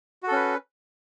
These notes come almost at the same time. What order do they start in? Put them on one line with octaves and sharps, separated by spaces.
F#4 A4 C#4 B4